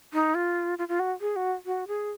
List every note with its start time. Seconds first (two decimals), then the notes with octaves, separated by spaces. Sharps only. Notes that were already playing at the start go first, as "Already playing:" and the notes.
0.13 D#4
0.35 F4
0.78 F4
0.88 F4
0.99 F#4
1.21 G#4
1.36 F#4
1.66 F#4
1.87 G#4